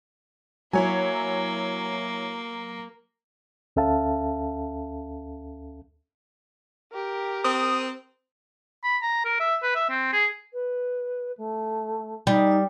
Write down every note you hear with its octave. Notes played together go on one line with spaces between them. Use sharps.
F#3 A#3 E4 C#5 G#5
D2 C#4 A4 E5 F5 A5
G4 A#4
C4 D#6
B5
A#5
A#4
E5
B4
E5
C4
G#4
B4
A3
G3 D#4